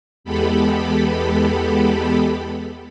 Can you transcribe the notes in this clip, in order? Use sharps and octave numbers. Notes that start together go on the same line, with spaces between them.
E2 G#3 B3 G4 A4 B5